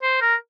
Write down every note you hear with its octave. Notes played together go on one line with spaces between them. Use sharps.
C5
A#4